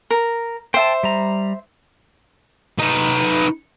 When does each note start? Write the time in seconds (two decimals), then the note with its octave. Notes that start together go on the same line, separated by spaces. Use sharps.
0.10 A#4
0.74 C5 E5 G5 A5
1.03 G3 A#5
2.79 D#4 B4